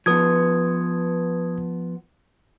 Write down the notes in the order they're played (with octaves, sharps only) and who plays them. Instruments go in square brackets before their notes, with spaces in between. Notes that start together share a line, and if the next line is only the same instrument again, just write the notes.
[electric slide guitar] F3 B3 [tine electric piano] B4 D#6 G#6